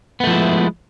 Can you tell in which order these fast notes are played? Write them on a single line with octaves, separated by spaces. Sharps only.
B3 A3 F3 E4 G#3